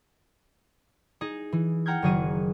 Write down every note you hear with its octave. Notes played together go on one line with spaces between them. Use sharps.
D#4 G#4
E3
F#5 G5 A#5 F6 G6 G#6
F#1 D#3 F#3 G#4 D#7